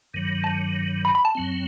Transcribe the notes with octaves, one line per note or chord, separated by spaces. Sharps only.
G2 D#3 F#3
A5
B5
B5
A5
F#2 F#3 C4